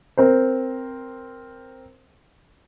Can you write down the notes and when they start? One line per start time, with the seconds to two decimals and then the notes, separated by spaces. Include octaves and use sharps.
0.17 C4 A#4 C5